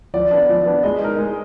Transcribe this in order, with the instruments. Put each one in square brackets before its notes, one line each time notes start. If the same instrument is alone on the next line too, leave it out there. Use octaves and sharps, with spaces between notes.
[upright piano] F3 [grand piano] D5
[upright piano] B3 D4
F3
B3 D4
[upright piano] G#3 [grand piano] D#5
[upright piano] D#4 A#4
G#3